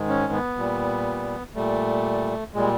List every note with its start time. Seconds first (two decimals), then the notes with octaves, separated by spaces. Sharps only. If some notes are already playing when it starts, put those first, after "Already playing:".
Already playing: G#2 D#3 G#3
0.08 C#4
0.33 B3
0.57 A#2 G3
1.55 A#2 G3 A3
2.54 A#2 G3 G#3